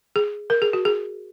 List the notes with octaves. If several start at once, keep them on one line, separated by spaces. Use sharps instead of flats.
G#4
A#4
G#4
F#4
G#4